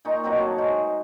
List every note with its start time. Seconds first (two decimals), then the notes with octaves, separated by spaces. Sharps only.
0.05 A#2 D#4 F4 C#6
0.23 B2 F#3 A#3 C4
0.36 A2 C#5 A5
0.58 G#2 C5